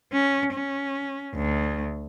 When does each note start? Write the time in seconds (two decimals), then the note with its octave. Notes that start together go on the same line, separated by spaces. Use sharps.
0.13 C#4
0.53 C#4
1.35 D2